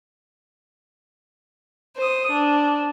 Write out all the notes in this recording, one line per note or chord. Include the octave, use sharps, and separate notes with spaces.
C5 D#6
D4